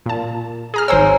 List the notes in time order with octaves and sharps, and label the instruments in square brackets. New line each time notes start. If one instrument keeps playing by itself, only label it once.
[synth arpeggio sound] A#2 A5
G#4 A#5 F6
[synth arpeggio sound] G#1 C5 E6 [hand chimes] C#5 G#5 A#5